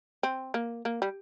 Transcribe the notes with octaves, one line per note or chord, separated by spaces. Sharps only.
C4
A#3
A#3
G3